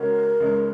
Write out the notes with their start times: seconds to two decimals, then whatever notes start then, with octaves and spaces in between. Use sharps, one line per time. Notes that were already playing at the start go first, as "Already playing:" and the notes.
Already playing: C#3 G#3 C#4 F#4 A#4
0.40 C#2 C#3 G#3 D#4